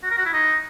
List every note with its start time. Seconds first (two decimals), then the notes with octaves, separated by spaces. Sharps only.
0.03 F#4
0.11 A#4
0.18 F#4
0.26 E4
0.33 D#4